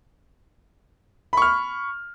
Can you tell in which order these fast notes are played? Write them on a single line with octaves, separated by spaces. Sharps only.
B5 C#6 F6